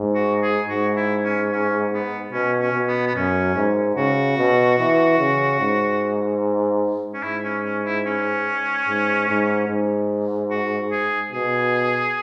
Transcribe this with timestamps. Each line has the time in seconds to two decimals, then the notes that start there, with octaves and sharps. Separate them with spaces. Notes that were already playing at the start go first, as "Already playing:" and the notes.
Already playing: G#2
0.15 F#4
0.43 G#4
0.69 G#2 F#4
0.96 E4
1.24 C#4
1.52 C#4
1.93 B3
2.32 B2 C#4
2.60 C#4
2.73 B2
2.88 B3
3.06 B3
3.15 F#2 C#4
3.55 G#2
3.96 C#3 F#4
4.37 B2
4.78 E3
5.19 C#3
5.60 G#2
7.14 C#4
7.23 G#2 E4
7.44 C#4
7.64 C#4
7.85 E4
8.06 C#4
8.88 G#2
9.28 G#2
9.68 G#2
10.51 F#4
10.92 G#4
11.32 B2 G#4